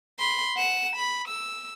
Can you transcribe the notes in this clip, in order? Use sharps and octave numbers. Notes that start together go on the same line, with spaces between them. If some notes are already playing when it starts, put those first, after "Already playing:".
B5 C6
F#5 E7
B5
E6